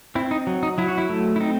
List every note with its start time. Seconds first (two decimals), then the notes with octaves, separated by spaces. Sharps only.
0.15 C4 E4
0.31 D#4
0.47 F#3
0.63 D#4
0.78 F#3 E4
0.88 F#4
0.98 E4
1.09 A3
1.36 E4
1.41 C4 D#4